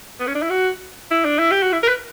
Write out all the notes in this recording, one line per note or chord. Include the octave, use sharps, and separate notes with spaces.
B3
C#4
D4
E4
F#4
E4
D4
E4
G4
F#4
E4
A#4
B4